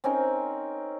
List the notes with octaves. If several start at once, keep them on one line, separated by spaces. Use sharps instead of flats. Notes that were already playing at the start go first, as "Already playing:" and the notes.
C4 C#4 D#4 A#4